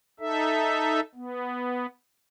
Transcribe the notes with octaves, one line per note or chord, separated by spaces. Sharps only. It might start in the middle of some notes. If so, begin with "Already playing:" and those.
D#4 A4 E5
B3